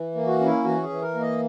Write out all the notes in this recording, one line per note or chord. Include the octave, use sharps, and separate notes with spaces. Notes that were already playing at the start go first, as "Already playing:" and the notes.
Already playing: E3
A#3
F#4
C#4
E4
E3 F#4
G#4
E3
A#4
A#3
D#5